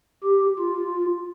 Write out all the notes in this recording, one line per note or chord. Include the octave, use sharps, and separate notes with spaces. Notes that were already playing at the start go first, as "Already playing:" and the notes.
G4
F4